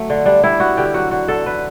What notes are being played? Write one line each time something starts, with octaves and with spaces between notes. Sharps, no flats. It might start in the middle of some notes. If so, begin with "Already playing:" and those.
Already playing: F#3 A3
D3
G3 D4
G3 E4
B3 F#4
D3 G4
F#3 F#4
D3 F#4
D3 A4
D3 B4